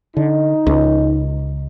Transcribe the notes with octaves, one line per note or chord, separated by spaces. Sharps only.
D3 D#4
C#2